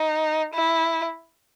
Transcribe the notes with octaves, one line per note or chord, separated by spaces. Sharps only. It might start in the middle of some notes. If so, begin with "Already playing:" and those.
Already playing: D#4
E4